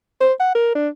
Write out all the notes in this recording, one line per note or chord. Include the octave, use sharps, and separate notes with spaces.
C5
F#5
A#4
D4